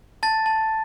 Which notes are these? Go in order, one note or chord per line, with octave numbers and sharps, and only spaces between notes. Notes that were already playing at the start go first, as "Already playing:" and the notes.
A5 A6
A5